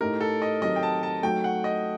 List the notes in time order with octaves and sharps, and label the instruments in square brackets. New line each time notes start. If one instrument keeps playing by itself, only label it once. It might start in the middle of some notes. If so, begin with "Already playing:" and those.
[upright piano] A2 A3 D#4 G4 [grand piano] A#4
[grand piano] A4
D#5
[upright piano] D#3 F#3 C4 G4 [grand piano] D#5
[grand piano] G5
A5
A5
[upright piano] F#3 A3 D#4 F#4 [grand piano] G5
[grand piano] F#5
D#5